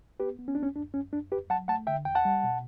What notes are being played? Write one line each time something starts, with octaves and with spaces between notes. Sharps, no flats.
B3 G4 B4
B3
C#4
D2 D4
C#4
F#2 D4
F#2 C#4
F#2 D4
E2 G4 B4
F#3 F#5 A5
A3 F#5 A5
D3 E5 G5
E2 G5
F#5 A5
G3
B2